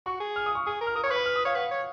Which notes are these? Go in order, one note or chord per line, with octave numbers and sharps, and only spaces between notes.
F#4 C#6
G#4
F6
D#6
C#6
G#4 D#6
A#4
F6
A#4 D#6
C#5 C#6
B4 B5
F6
D#6
C#5 F5
B4 F#5
C#5